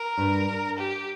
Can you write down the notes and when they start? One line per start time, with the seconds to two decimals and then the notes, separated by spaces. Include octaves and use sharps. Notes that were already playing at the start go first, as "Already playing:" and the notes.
Already playing: A#4
0.17 G2
0.79 G4